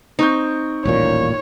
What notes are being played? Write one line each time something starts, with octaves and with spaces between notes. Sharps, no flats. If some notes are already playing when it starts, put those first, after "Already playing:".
C4 D#4 C#6 G6
D#1 A1 A#2 C#5